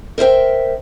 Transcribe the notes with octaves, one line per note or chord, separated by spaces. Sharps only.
A#4 C5 E5 G5